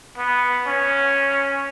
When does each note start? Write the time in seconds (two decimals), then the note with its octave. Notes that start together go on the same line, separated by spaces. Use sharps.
0.18 B3
0.66 C#4